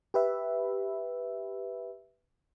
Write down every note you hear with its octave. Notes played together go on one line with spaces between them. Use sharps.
G4 B4 E5